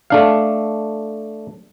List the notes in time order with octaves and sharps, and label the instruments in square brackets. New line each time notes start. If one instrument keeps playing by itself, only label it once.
[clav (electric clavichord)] A3 D4 F5